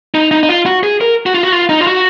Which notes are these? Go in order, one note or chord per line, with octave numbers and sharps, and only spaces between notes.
D#4
D#4
D#4
F4
F#4
G#4
A#4
F#4
F4
F#4
F4
D#4
F4
F#4